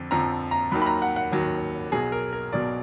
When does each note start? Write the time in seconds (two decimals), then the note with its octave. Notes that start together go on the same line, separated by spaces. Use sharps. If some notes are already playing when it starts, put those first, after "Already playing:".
Already playing: F2 D3
0.11 F2 D3 F3 A#5
0.51 A#5
0.72 D#2 D#3 F#3 B5
0.82 B5
0.86 A#5
1.02 F#5
1.16 F#5
1.32 D#2 D#3 F#3
1.92 B1 B2 F#3 G#4
2.12 A#4
2.33 A#4
2.53 B1 B2 F#3 D5